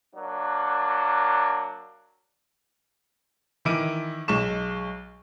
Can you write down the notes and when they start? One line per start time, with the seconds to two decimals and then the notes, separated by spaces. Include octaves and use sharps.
0.16 F#3 A#3 D4
3.65 D#3 E3 E4 D6 D7 D#7
4.28 B1 G#3 C#6 E7